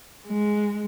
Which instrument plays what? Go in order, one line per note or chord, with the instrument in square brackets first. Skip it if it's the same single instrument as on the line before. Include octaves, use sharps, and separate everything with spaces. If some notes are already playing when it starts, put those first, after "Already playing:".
[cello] G#3